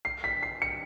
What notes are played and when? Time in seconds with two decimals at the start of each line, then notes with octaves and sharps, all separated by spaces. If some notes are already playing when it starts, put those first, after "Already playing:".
0.05 C7
0.24 B6
0.43 C7
0.62 C#7